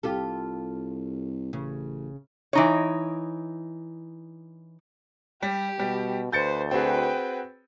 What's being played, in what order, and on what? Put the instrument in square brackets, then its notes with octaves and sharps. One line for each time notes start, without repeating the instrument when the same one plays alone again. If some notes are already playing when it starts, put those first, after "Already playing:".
[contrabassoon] C2 [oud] F4 G4 A4
[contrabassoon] A1 [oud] C#3
[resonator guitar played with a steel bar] E3 D#4 C#5
[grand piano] G3 [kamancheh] G4
[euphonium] B2 [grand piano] G3
[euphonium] D2 [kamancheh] B4 C5 [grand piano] G6 A6 C#7
[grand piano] C4 F#4 G#4 [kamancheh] B4 G5